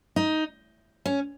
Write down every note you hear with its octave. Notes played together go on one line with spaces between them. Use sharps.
D#4
C#4